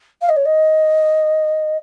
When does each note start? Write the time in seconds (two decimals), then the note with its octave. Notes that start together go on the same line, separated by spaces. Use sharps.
0.21 F5
0.28 D#5
0.36 C#5
0.45 D#5